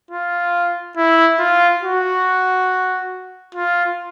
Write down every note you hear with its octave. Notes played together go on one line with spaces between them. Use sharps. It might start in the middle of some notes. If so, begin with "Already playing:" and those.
F4
E4
F4
F#4
F4